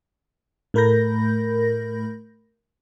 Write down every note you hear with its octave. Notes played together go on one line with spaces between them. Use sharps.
A2 A3 A#4 B5 G6 A#6